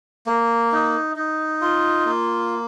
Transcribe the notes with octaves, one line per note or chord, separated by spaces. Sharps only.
A#3
D#4
D#4
F4
A#3